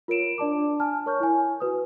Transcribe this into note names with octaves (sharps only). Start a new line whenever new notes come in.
F4 A#4 C#5 D7 E7
D4 D5 A5 D6
G#5 A5 F6
A#4 C#5 C#6 F6 G6
E4 G#5
F#4 B4 D#6